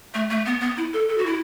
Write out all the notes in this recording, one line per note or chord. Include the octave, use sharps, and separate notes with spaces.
A3
A3
B3
B3
E4
A4
A4
F#4
E4